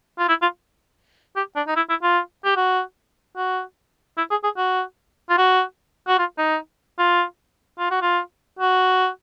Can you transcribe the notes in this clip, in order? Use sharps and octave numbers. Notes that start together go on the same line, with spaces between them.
F4
E4
F4
G4
D4
D#4
E4
E4
F4
G4
F#4
F#4
E4
G#4
G#4
F#4
F4
F#4
F#4
F4
D#4
F4
F4
F#4
F4
F#4